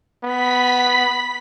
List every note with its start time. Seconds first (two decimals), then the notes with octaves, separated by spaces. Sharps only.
0.23 B3 B5 B6